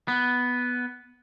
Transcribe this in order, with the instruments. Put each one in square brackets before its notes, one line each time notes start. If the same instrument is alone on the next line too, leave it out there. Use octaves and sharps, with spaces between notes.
[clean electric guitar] B3